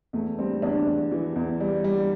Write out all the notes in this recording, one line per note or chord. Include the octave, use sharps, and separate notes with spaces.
E2 A3
G3 C4
E2 D4
E2
E3
E2
G3
G3